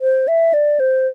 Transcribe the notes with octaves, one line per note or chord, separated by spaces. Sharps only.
C5
E5
D5
C5